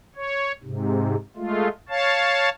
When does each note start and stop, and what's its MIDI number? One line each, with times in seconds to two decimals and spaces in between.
0.16 0.52 73
0.64 1.16 44
0.64 1.16 48
1.37 1.68 56
1.37 1.68 57
1.37 1.68 65
1.89 2.49 73
1.89 2.49 77
1.89 2.49 81